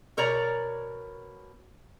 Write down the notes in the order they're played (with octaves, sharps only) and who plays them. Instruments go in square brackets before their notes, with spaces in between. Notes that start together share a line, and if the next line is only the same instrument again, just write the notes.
[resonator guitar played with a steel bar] B2 A#4 C#5 D5 A#5